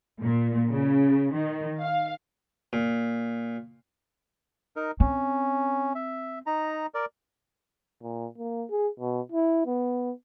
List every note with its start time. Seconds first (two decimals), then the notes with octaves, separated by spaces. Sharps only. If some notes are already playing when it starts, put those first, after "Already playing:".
0.20 A#2
0.69 C#3
1.34 D#3
1.82 F5
2.73 A#2
4.76 D#4 A#4
5.00 C4 C#4
5.95 E5
6.46 D#4 A#5
6.94 A#4 D5
8.02 A#2
8.38 A#3
8.70 G#4
9.00 B2
9.32 E4
9.66 B3